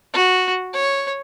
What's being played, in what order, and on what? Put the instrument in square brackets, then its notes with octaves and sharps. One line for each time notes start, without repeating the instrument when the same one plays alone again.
[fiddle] F#4
C#5